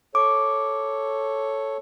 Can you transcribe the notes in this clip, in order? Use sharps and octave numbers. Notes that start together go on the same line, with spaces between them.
A4 C#5 D6